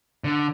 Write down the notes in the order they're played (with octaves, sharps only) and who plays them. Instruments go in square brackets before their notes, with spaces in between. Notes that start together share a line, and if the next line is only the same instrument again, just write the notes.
[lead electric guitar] D3